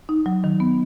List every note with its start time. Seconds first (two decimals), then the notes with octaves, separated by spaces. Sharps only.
0.09 D#4
0.26 F#3
0.44 D#3
0.60 B3